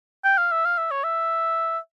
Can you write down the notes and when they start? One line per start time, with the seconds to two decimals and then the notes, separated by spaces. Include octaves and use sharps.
0.24 G5
0.38 F5
0.51 E5
0.65 F5
0.78 E5
0.91 C#5
1.03 E5